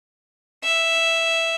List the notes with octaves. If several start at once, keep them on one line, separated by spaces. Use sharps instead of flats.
E5